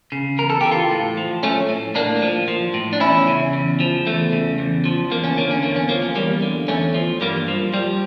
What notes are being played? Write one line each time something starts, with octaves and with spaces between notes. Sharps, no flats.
C#3
E2 A#4
A4
E3 G4
F4 A4
A2
F3
F3 A3 C#4
A2
A2 A#3 D4
F3
F3
A2
D4
E2 C#4 E4
C#3
E2
F3
E2 A3
C#3
E2
F3
E2 A#3
C#4
D3 A#3
C#4
E2 A#3
C#4
F3 A#3
C#4
E2 G3 A#3
D3
E2 A3 C#4
F3
G2 G3 A#3
F3
F3 G3